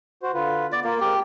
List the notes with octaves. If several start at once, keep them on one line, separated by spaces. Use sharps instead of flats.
F#4 C5
D3 F4 B4
B3 D5
A#3 F4 A#4
G#3 C4 G4 A#4